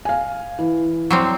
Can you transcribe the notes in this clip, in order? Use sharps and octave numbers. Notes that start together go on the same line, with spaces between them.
F5 G#5
E3
F#3 G3 C4